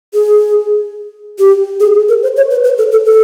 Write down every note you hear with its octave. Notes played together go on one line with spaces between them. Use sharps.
G#4
G4
G#4
A#4
C5
C#5
B4
B4
A4
A4
A4